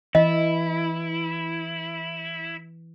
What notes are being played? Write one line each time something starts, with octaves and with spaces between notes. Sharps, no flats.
E3 E4 D#5